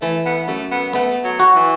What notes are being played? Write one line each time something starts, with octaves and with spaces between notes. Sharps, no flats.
E3 A3
B3
F#2 A3
B3
A3 B3
F#3
F#4
E3